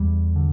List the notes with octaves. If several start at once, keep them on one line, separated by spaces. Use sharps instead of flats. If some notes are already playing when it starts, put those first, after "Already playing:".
Already playing: E2 G3
D3